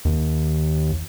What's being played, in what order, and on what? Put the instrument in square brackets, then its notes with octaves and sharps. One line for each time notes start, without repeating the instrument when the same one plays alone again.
[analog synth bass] D#2